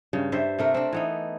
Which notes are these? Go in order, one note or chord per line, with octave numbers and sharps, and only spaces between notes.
G2 C#3 G3
G2 G3 C5 E5
C3 A3 A#4
C4 D4
E3 B3 D#4